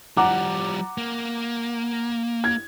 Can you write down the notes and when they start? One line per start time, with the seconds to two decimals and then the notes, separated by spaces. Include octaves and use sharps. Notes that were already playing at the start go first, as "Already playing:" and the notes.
0.17 F3 G3 F#5 A#5 D6
0.98 A#3
2.44 G#6